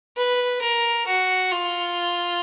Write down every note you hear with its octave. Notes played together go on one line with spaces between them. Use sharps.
B4
A#4
F#4
F4